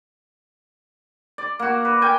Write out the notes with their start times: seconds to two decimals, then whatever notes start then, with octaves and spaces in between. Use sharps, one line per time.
1.38 D5
1.59 A#3 F#4
1.85 B4
2.02 A#4 G5 G#5